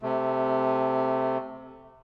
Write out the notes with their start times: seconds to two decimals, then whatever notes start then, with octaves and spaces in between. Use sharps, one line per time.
0.02 C3 A3